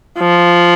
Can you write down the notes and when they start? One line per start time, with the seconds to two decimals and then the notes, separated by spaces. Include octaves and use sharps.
0.19 F3